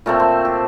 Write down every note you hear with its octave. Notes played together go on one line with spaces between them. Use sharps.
A#2 A3 C4 A#4
C5
G4